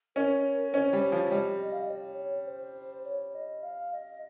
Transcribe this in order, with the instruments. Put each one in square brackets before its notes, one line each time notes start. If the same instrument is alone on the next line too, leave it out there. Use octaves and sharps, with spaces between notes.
[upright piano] C#4 [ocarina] A#4
[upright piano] C#4 [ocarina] C5
[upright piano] G3
[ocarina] C#5
[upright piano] F3
[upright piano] G3 [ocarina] D#5
[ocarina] F5
D#5
C#5
C#5
C#5
C5
C#5
D#5
F5
D#5